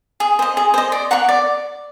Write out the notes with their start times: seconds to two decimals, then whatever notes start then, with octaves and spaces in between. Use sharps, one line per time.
0.20 G#4
0.39 C5 D#5
0.57 G#4
0.74 C5 D#5
0.92 D5
1.11 F#5 A#5 C#6
1.29 D5